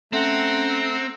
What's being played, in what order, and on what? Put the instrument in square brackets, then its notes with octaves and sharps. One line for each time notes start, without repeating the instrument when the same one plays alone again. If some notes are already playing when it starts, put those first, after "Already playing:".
[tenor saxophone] A3 [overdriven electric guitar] C4 [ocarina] C#4 [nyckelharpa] F#5 A#5